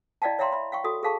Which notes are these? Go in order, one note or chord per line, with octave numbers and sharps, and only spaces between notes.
E4 D5 D#5 F5 G5 A5
C#5 E5 F5 G5 A#5 C6
E5 B5
F5 G5 C#6
F#4 A4 D#6
G#4 A4 F5 A5 C#6